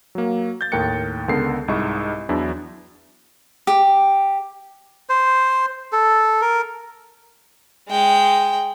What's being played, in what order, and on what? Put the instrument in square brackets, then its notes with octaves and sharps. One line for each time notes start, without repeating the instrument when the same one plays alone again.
[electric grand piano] F#3 A#3
G6 A6
D#2 A2 A#4 G5 F#6 C#7
C#2 D3 B3 A4 A#4 C7
C2 G#2 E4 D#5 C#6
E2 E3 F#3 D4 E4
[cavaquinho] G4
[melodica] C5
A4
A#4
[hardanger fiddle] G#3 G5